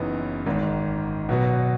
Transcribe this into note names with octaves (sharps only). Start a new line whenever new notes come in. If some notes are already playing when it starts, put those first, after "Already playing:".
Already playing: F#1 F#2 E3 B3 D#4
G#1 G#2 D#3
B2 F#3 B3 F#4